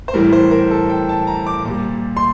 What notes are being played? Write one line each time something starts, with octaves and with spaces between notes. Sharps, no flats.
C5
A2 E3 G3 A#4
C5
A#4
A4
G5
A5
A#5
D6
A#2 G3
C6